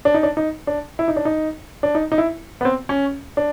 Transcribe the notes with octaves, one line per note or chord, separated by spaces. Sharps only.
D4
D#4
D4
D#4
D4
E4
D#4
D4
D#4
D4
D#4
D#4
E4
B3
C4
C#4
D4